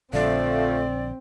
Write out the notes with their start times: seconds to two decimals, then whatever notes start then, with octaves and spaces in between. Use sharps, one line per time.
0.13 A#1 D3 F3 A3 C4 D5